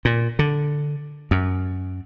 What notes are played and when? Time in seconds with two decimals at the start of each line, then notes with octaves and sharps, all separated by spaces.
0.05 A#2
0.39 D3
1.31 F#2